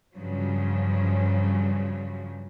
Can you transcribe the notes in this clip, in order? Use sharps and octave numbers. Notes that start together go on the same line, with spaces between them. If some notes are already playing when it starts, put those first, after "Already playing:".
G2 C#3 F3 F#3